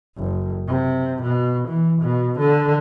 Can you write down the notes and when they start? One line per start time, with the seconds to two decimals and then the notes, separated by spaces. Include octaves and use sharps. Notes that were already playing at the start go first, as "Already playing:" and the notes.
0.18 F#1
0.68 C3
1.22 B2
1.68 E3
2.01 B2
2.39 D3